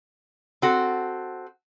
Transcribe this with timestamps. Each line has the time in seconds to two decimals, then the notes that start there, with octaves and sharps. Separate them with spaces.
0.62 C4 F#4 A4